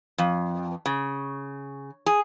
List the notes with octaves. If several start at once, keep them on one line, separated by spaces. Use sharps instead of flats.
F2
C#3
G#4